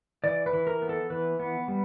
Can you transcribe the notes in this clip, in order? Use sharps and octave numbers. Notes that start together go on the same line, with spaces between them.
E3 D5
B4
E3
A#4
B3
A4
E3 B4
B3
G3